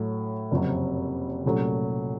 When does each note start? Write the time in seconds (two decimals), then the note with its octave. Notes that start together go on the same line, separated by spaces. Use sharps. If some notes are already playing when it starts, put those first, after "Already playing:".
Already playing: A2 F#3 A3
0.51 F#1 F2 C3 F#3
1.45 C2 A#2 F#3 A3 C#4